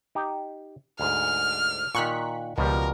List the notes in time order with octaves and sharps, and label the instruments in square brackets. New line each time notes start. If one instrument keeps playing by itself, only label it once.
[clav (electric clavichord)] D#4 G4
[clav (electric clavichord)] D2 G#2 [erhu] F6
[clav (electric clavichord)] A#2 D#3 [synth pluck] C#6 F#6 B6
[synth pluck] C#2 [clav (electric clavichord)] B2 F3 G3 [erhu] A#4